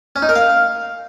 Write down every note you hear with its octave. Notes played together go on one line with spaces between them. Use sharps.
C#4
D#4
A#4
F5